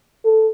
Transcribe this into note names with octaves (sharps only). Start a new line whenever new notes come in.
A4